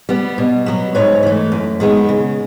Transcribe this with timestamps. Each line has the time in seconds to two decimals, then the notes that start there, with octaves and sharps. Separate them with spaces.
0.09 G3 B3
0.38 B2
0.66 F#3 B3
0.95 G#2 B4 C#5
1.23 E3 A3
1.52 F#2
1.80 D#3 G#3 B3
2.09 C#3